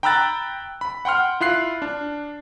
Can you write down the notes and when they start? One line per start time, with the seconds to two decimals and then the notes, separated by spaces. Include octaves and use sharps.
0.03 G5 A#5 B5 E6 F#6 A6
0.81 B5
1.05 F#5 G5 C6 F6
1.41 E4 F4 F#6 C7
1.82 D4